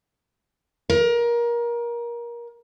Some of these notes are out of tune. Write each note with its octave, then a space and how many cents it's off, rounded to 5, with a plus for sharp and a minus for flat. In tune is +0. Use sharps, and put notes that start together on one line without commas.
A#4 +25